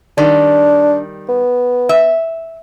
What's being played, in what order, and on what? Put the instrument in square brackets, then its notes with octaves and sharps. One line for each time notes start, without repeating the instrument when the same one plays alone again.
[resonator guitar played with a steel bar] D#3 G3 [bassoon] D4
[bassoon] B3
[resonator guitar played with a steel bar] E5